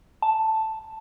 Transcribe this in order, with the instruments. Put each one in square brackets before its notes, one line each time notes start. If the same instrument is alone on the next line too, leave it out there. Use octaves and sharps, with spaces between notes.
[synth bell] A5